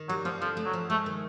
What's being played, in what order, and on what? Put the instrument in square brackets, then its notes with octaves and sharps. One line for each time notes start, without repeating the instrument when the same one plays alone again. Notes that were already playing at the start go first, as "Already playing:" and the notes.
Already playing: [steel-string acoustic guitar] D#3
[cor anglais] F#3 [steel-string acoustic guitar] G3
[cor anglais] F3 [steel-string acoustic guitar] C4
[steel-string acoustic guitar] D3 [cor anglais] F3
[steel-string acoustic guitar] A3
[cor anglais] F#3
[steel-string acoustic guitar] F3
[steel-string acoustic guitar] G#3 [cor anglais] A3
[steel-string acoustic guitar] D#3